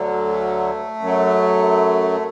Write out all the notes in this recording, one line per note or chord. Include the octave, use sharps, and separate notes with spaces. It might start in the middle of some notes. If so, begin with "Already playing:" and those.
Already playing: D2 D3 F#3
A3
F#2 F#3